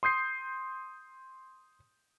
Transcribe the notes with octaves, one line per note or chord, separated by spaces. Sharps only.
C6 D#6 G6 C7